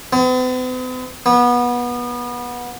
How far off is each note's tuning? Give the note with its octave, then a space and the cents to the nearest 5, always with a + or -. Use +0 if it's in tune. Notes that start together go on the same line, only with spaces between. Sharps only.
B3 +45
B3 -25